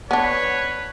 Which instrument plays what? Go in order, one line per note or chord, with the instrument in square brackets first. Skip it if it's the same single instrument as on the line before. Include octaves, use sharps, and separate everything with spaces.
[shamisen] B3 D4 [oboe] B4 [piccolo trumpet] C#5